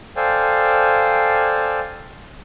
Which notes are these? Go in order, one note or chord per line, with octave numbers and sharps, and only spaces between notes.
A4 C5 D5 F5 G5 G#5